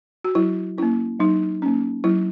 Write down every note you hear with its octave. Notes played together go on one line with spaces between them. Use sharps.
F#4
F#3 E4
A#3 C#4 E4
F#3 D#4
A#3 C#4
F#3 E4